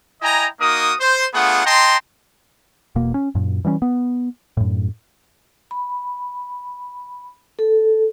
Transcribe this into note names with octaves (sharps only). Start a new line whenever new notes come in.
E4 D#5 G5 G#5 A#5
A#3 D#4 F#4 A#4 D#6
C5
A3 B3 D4 F4 G#4 F#5
D#5 G5 A5 A#5 C6
E1 B2 A#3
C#4
F#2 A#2
E3 G3 A#3 C#4
B3
F#2 A2
B5
A4